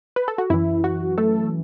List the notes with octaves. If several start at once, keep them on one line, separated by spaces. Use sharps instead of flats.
B4
A4
F#4
F#2 E3 E4
F#4
A3 A4